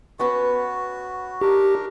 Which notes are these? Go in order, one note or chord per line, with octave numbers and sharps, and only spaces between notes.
B3 C#4 F#4 B4
D4 D#4 G4 A#4